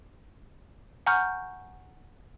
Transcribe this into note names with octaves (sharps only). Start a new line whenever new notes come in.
F#5 G#5 A#5 C#6 F6 G6